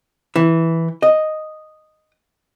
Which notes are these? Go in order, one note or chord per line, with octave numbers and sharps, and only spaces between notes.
E3
D#5